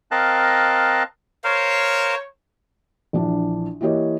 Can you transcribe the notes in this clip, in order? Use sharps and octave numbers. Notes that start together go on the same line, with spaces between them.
C4 A#4 D#5 F5 A5 F#6
A#4 C5 C#5 F5
A#1 E3 D4
E3 A#3 G4 C#5 D#5